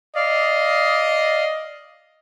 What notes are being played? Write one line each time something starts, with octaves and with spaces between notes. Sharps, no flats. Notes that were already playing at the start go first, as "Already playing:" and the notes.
D5 D#5 F5